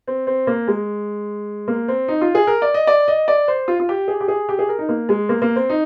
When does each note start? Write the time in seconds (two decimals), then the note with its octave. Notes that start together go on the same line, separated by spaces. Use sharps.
0.07 C4
0.27 C4
0.47 A#3
0.68 G#3
1.68 A#3
1.88 C4
2.08 D#4
2.21 F4
2.35 G#4
2.47 A#4
2.62 D5
2.74 D#5
2.87 D5
3.08 D#5
3.28 D5
3.48 C5
3.68 F4
3.80 F4
3.89 G4
4.08 G#4
4.21 G4
4.28 G#4
4.49 G4
4.59 G#4
4.69 A#4
4.79 D#4
4.89 A#3
5.09 G#3
5.29 A#3
5.42 A#3
5.56 C4
5.70 D#4